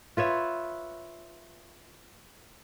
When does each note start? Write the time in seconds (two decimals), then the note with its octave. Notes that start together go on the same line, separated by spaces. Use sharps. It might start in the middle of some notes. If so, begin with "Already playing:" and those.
0.17 F4 B4 C#5 E5